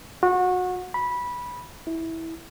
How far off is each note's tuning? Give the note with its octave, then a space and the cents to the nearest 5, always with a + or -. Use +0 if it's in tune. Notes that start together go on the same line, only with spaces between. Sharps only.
F#4 -25
B5 -15
E4 -15